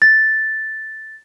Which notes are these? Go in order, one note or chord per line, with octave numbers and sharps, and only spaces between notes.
A6